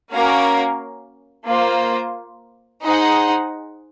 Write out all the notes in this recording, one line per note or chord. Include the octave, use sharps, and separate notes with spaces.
A#3 C#4 F#4 A#4 F5
A#3 F4 C5
D#4 G#4 C5 D#5 F#5